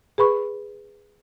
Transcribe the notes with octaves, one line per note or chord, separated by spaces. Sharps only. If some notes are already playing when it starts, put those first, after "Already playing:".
G#4 B4 B5 C#6